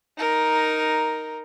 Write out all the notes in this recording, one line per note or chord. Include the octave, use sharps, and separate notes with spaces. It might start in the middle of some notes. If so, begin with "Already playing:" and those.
D#4 A#4